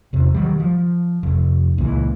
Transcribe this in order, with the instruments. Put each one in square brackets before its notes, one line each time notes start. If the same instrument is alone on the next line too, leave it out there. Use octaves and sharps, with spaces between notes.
[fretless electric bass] E2 C3
D#3 F#3 G3
F3
F1
C#2 A#2 E3